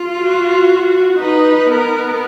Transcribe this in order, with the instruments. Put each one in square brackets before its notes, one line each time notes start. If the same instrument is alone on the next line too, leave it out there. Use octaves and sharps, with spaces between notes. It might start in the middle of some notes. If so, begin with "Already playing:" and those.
Already playing: [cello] F4
[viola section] F#4
[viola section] D#4 [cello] B4
[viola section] B3 [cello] A#4